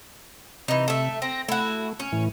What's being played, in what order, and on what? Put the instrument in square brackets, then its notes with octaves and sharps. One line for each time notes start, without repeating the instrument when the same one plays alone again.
[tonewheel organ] C3 [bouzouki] E3 D#4
[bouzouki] A3 E5
[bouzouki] C4 [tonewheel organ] A#6
[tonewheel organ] A3 [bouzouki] E4 F#4
[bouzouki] C#4
[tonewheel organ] A2 E3